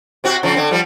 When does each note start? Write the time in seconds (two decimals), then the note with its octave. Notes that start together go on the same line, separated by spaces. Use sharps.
0.24 C3 C4 F#4
0.43 C#3 F3 C4
0.56 D3 C4
0.71 F3 G3